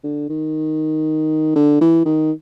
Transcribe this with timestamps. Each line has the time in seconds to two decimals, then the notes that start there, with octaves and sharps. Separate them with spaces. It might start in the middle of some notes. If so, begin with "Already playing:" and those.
0.04 D3
0.30 D#3
1.56 D3
1.81 E3
2.05 D#3